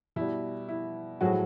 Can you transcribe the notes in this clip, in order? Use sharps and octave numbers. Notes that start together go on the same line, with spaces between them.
B2 G3 E4
E4
A2 F3 F#3 G#3 F#4